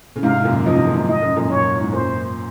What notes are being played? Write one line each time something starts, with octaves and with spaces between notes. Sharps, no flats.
C#3
G#2 C3 F5
F#2 A#2
C#3 F3 D#5
C3 D#3
A#2 C#3
G#2 C3
G#2 D#5
F#2
F#2 A#2
F#2 A#2 C#5
G#2
F#2 A#2 C5